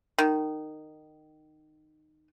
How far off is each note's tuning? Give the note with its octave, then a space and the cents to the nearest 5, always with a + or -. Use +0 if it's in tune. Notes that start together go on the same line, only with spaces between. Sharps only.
D#3 -15